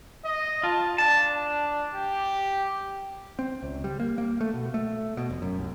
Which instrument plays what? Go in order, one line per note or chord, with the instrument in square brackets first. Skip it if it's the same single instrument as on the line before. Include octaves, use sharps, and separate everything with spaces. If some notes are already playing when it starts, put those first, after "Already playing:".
[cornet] D#5
[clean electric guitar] F4 [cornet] A5
[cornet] D4 [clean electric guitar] A5
[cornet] G4
[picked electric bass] C4
C#2
G3
A#3
A#3
A3
B2
A3
B2
F1
F#2
C2